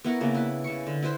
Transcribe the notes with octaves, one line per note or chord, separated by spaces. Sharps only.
B3 E4 A#4 C#6
C#3 A#3 B3 D4
E4 B4
C#3 C#6
D3
E4 B4 C5 E5